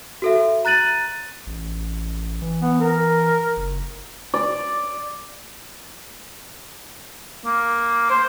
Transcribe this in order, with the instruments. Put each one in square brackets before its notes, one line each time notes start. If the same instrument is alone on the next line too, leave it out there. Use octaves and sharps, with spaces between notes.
[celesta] F#4 A4 E5
A#5 F#6 A6 D#7 F#7
[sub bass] A1
E3
[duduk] B3
A#4
[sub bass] F#1
[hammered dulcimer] D5
[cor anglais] A#3
C5